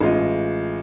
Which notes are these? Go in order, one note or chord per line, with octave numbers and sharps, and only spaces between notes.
A1 G#3 F4 D#5